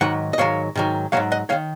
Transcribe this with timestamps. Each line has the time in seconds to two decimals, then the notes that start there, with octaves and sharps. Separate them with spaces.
0.01 G#2 D#3 F#3 F#5
0.33 D#5
0.38 G#2 D#3 F#3 C#5 F5
0.75 G#2 D#3 F#3
1.12 G#2 D#3 F#3 C#5 F5
1.32 D#5 F#5
1.49 D#3 F#3 C#5 F5